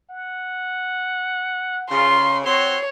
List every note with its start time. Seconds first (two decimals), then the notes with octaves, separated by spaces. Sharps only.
0.10 F#5
1.90 C#3 F4 C6
2.45 C4 F#4 C#5 C6